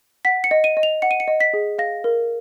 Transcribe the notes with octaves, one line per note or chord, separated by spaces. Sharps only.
F#5 B6
C#7
D#5
D#7
D#5
F7
F#5 C#7
D#7
C#7
D#5
B6
G#4
F5 A#6
A#4